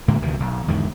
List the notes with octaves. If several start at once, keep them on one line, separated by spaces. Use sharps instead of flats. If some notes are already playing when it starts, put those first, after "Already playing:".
A2 D3 G#3 A#3
D2 C3 D#3 E3
B1
E2 G#2 D3 D#3